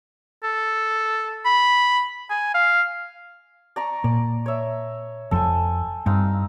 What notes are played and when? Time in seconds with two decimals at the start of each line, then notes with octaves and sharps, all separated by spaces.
0.43 A4
1.45 B5
2.30 G#5
2.54 F5
3.76 D5 A#5 C#6
4.04 A#2 D5
4.46 C#5 E5
5.31 F1 F2 A4 C5 G#5
6.06 G2 C4 D#4 F5